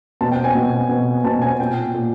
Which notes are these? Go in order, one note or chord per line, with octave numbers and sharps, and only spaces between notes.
B2 A5
G5
G#5
B2
B2
B2 A5
G#5
A#2 G5
A#2